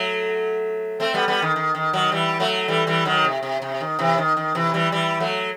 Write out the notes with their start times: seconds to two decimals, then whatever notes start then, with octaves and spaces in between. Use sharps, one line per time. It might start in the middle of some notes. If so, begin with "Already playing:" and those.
Already playing: F#3 A3
1.00 A3 C4
1.14 G3 B3
1.28 G3 B3
1.42 D#3
1.56 D#3
1.75 D#3
1.93 D#3 F#3
2.12 E3 G3
2.40 F#3 A3
2.68 E3 G3
2.87 E3 G3
3.05 D#3 F#3
3.24 C3
3.43 C3
3.62 C3
3.80 D#3
3.99 C3 E3
4.18 D#3
4.37 D#3
4.55 C3 E3
4.74 E3 G3
4.92 E3 G3
5.20 F#3 A3